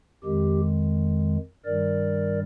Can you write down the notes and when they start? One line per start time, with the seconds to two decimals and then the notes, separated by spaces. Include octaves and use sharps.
0.24 F2 D#3 G#3 G4
1.65 G2 D#3 G3 A#4 D5